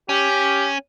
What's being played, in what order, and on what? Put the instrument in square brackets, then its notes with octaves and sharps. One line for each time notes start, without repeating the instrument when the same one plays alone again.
[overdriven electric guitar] C#4 [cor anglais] G4